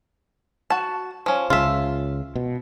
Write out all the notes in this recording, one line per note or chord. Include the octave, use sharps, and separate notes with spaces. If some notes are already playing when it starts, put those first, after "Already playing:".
F#4 A5
F3 C#4
C#2 C#3 F4 E5
B2